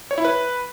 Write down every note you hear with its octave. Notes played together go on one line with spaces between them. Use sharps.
C#5
E4
B4